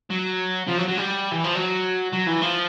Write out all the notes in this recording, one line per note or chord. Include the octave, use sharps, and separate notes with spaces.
F#3
F3
F#3
F#3
G3
E3
F3
F#3
F#3
E3
F3